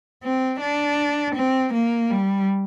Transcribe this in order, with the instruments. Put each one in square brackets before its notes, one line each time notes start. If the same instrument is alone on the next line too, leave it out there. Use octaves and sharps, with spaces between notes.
[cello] C4
D4
C4
A#3
G3